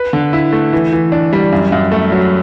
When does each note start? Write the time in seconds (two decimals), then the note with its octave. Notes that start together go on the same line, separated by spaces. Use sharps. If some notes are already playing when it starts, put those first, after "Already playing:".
Already playing: B4
0.13 D3
0.33 E4
0.52 A3
0.73 E3
0.93 E3
1.12 D4
1.33 G3
1.52 F#2
1.72 F#2
1.92 A3
2.12 F#3